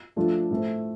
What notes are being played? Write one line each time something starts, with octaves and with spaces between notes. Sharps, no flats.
F3 A3 D4 F4 A4
A2 A3 C4